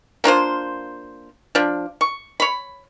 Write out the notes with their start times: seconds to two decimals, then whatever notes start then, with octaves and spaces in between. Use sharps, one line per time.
0.24 A#3 D4 F4 C5
1.55 F3 D4
2.01 C#6
2.40 C#5 B5